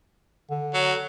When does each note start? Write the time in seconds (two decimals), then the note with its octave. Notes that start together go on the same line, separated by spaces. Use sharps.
0.50 D3
0.74 F#3